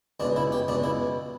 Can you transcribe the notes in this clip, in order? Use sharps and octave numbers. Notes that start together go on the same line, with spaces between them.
C#2 B2 D4
E4
G4
C#2 B2 D4
E4